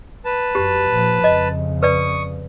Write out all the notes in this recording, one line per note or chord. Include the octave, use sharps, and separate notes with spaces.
B4 A5
F#2 G4
A#2 F3
F2 C#3 D#5
B4 D5 C#6 D#6